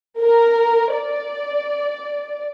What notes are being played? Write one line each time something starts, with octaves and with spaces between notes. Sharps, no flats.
A#4
D5